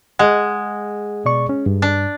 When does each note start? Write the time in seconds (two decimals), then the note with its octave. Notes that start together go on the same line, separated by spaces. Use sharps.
0.19 G#3 G#4 F#5
1.25 B2 D5 C#6
1.49 C#4
1.66 G2
1.82 D4